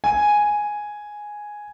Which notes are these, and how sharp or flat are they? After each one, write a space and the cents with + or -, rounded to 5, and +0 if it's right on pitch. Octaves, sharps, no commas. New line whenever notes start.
G#5 +0